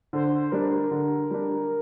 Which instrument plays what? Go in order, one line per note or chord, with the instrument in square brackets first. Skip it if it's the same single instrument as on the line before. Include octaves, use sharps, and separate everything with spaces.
[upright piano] D3 [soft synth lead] C5
[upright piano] G3 D4 [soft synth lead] A#4
[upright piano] D3
G3 D4